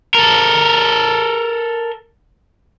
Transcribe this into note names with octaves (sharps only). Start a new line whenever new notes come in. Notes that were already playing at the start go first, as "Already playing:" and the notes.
A4 A#4